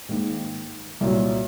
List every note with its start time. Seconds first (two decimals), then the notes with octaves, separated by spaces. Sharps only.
0.09 G#2 D#3 A#3
1.01 C2 A#2 F#3